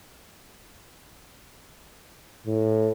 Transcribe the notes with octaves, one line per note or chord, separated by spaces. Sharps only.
A2